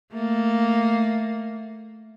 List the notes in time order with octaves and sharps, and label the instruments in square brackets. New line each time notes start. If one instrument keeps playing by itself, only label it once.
[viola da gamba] A3 A#3